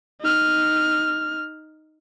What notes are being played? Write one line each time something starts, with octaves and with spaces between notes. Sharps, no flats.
D#4 F6